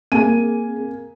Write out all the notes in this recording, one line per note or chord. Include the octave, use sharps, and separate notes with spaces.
A#3 C4 G#4 G#5 D#7